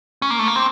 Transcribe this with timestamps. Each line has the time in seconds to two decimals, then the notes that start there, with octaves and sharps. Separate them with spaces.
0.22 C#4
0.30 A#3
0.39 A3
0.47 A#3
0.56 C4